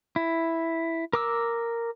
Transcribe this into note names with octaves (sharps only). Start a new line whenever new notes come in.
E4
A#4 D6 E6